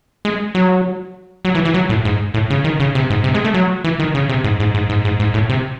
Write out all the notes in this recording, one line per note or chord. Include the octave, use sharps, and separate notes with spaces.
G#3
F#3
F#3
E3
E3
F#3
A2
G#2
A2
C#3
D#3
C#3
C3
G#2
C3
G#3
A3
F#3
E3
D#3
C#3
C3
G#2
G#2
G#2
G#2
G#2
G#2
A2
C3